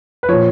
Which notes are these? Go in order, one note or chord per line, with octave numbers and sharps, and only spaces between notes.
B4
A#2 F3 C#5